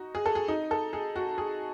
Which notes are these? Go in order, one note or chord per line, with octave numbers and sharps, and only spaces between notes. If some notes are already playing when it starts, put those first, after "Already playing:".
Already playing: D#4 F#4
G#4
A4
G#4
D#4
A4
G#4
F#4
G#4